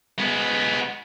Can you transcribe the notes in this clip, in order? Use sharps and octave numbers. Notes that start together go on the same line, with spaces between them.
G#3 B3